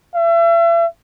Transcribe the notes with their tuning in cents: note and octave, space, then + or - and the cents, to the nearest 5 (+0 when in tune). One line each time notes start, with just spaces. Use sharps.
E5 +40